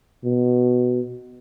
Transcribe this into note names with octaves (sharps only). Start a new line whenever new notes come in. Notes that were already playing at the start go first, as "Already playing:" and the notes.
B2